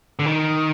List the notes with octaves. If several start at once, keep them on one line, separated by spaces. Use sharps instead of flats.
D3
D#3